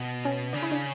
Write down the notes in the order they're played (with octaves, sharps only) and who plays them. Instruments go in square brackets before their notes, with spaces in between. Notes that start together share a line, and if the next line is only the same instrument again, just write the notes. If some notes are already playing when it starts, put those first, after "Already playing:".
Already playing: [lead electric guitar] B2
[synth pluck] C#4
[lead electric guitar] C#3 [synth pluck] D4
[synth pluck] E4
D4